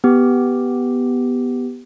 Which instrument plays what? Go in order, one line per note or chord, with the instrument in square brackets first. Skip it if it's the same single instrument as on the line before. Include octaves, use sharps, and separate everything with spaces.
[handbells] B3 G4